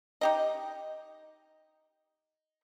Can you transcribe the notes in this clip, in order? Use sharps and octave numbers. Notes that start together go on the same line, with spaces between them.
D#4 G4 D#5